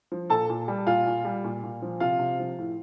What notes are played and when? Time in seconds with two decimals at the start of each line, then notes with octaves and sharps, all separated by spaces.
0.12 F3
0.30 A#2 A4 A5
0.50 A#2
0.68 G3
0.87 A#2 F4 F5
1.07 A#2
1.25 G3
1.44 A#2
1.63 A#2
1.82 F3
2.00 C3 F4 F5
2.19 C3
2.39 F3
2.59 A2